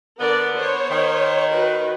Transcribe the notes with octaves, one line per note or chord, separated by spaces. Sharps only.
D3 B3 A#4 D5
C5 C#5
D#3
F#4 B4